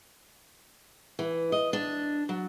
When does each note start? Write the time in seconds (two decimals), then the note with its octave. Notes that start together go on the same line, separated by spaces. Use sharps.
1.19 E3
1.52 D#5
1.73 D4
2.29 F#3